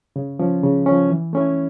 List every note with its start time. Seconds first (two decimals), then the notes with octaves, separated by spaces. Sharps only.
0.16 C#3
0.39 F3 C#4
0.63 C#3
0.86 F3 C#4
1.10 E3
1.33 A3 C#4 E4